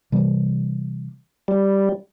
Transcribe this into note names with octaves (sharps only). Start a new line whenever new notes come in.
C3 E3 G3 A#3
G3